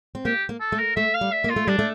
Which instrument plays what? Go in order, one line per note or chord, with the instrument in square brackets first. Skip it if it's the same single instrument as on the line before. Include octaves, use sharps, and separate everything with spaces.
[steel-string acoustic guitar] C4
[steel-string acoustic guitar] A#3 [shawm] G4
[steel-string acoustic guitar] A#3
[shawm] A4
[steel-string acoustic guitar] A3
[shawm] A#4
[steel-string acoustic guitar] A3 [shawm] E5
[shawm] F5
[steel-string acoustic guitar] G3
[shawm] E5
[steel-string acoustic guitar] A#3
[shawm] F4
[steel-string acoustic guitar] A3
[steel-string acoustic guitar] G3 [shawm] D4
[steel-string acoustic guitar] A3